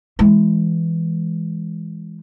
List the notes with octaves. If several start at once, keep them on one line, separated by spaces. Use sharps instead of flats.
E3 G#3